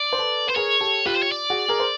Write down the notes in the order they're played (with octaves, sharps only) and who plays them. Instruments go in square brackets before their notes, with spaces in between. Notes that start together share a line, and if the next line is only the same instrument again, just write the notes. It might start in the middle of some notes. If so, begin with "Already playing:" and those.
Already playing: [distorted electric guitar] D5
[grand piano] C5
A4 B4
[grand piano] B4 [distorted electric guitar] C5
[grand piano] G#4 A#4 [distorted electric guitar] C#5
[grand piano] G4 A4
[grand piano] F4 G4 [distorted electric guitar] B4
[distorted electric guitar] C5
C#5
D5
[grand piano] F#4 G#4
G#4 A#4
C5